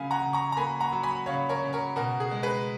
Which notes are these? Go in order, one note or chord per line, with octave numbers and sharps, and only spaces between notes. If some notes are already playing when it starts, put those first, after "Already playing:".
Already playing: C#3 F#3 A#3 F5 G#5 B5
F#5 A#5
C#3
A#5 C#6
A#5
A#3 G#5 B5
F#5 A#5
F#3
G#5 B5
C#3 C#5 F5
A#4 C#5
C#3
A#4 C#5
B2 F#4 A#4
G#4
G#3
G#4 B4